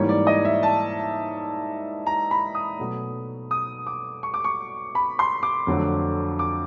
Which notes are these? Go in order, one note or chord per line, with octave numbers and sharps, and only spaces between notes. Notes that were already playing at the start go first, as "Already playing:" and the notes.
Already playing: G#2 E3 G3 A#3 C#5
D5
D#5
E5
A5
A#5
B5
D#6
B2 F#3 A3
D#6
D6
C#6
D6
C#6
B5
C6
D6
F2 D3 F#3 A3
D6